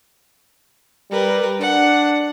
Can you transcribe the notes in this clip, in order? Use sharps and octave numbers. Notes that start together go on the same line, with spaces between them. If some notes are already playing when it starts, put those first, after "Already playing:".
G3 A#4 B4
D4 F#5